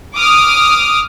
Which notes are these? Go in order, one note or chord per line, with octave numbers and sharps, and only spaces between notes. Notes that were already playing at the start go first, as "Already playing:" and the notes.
D6 D#6 F6